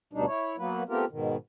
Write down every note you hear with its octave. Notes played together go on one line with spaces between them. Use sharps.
D2 B2 G3 D4 D#4
E4 C#5
F#3 A#3 B3 B4
A3 B3 C4 F4 G4 A#4
G#2 B2 D#3